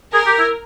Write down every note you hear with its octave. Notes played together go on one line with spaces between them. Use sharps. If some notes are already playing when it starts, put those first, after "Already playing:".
G#4 A#4
G4
E4